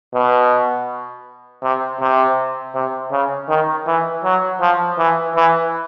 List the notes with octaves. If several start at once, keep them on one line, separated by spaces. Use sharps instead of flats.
B2
C3
C3
C3
C#3
D#3
E3
F#3
F3
E3
E3